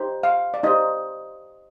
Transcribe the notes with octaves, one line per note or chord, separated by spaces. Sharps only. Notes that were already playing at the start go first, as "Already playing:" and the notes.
Already playing: D#4 G4 C5
F5
D5
D#4 G4 C5 D#5